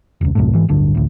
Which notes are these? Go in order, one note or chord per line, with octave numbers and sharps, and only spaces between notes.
E1 C#2
C2 F#2 A2
G#2 E3
D1 G1 G2 D3
A1 D2